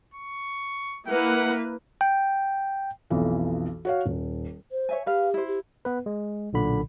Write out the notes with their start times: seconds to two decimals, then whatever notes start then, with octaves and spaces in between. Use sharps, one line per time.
0.14 C#6
1.07 A#3 E4 B4 F#5
2.01 G5
3.10 B1 F2 E3
3.85 F#4 C#5 F5
4.06 D#1
4.71 C5
4.89 C#5 E5 G#5
5.06 G4 B4 F5
5.34 E4 C5
5.48 G4
5.85 B3 B4
6.06 G#3
6.53 B1 A#2 D3 B5